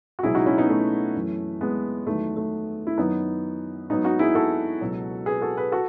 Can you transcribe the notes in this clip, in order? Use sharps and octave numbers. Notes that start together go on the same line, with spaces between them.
F#4
C#2 B2 F#3 E4 G#4
D#4 F#4
C#4 E4
B3 D#4
A3 C#4
F#2 E3
G#3 B3
E2 D#3 F#3 A3
A3
E4
F#2 D#3 F#3 B3 D#4
G#2 F#3 B3 D#4
D#4 F#4
E4 G#4
F#4 A4
C#2 B2 F#3
G#4 B4
F#4 A4
G#4 B4
F#4 A4